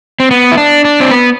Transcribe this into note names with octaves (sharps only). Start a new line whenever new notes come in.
C4
B3
E4
D4
D4
C4
B3